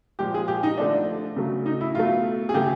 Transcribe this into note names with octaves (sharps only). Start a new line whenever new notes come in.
A#2 F3 G#3 G4
G#4
G4
D#4
D3 F3 A3 D4
C#3 F#3 A3
D#4
E4
B2 F#3 A3 F4
G#4
C#3 F#3 A3 G4